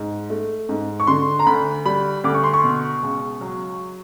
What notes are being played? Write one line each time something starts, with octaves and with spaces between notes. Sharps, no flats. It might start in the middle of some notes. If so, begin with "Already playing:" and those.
Already playing: G#2
A3
G#2
C#6
D3 C6
A#5
D2 B5
G3 B5
D2 D6
C#6
C6
C#6
B2
C#2
F#3